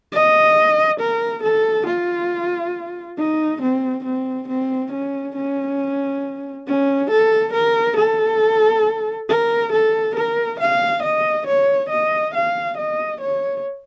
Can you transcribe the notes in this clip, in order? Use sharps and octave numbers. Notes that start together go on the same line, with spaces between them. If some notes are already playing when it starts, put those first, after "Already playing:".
D#5
A#4
A4
F4
D#4
C4
C4
C4
C#4
C#4
C#4
A4
A#4
A4
A#4
A4
A#4
F5
D#5
C#5
D#5
F5
D#5
C#5